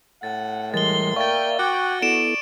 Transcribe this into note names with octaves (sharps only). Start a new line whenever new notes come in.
A2 F#5 A6
E3 G3 G#3 A#4 C6 A6 G7
A#3 D5 E5 F5 G5 C#6 A6
F#4 G5 D6 F#6
B3 E4 A4 D5 D7 E7